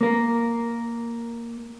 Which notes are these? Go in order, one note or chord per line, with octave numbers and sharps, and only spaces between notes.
A#3 A#4